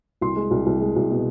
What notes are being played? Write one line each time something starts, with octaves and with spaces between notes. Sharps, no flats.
C2 C6
G#3
C2
C2
G#3
C2
B2